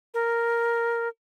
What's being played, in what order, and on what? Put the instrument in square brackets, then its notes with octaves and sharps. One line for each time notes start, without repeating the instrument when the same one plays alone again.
[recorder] A#4